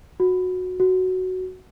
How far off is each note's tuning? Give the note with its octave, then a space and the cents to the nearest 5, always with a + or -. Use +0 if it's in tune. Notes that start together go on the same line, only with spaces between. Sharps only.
F#4 -15
F#4 +5